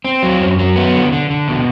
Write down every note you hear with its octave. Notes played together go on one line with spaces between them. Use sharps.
C4
F#3
F#2
F#3
B3
D3
D3
D3
B2